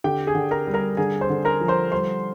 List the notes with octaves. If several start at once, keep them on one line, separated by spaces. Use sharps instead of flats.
D3 G4 G5
G#4 G#5
D3
A#4 A#5
G3
A#4 A#5
D3 G#4 G#5
C5 C6
D3
A#4 A#5
F3
C5 C6
G3 C5 C6